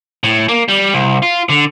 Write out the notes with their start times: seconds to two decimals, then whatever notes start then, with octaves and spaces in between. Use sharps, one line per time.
0.24 A2
0.48 A#3
0.68 G3
0.94 C2
1.22 F4
1.50 D3